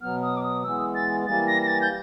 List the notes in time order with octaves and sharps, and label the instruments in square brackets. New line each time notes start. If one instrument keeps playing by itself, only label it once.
[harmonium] B2 F#3 B3 [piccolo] F6
[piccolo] D#6
D6
D#6
[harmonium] E3 G#3 B3 [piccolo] E6
[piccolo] A6
[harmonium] E3 G3 A#3 [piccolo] A6
[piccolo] A#6
A#6
A6
G6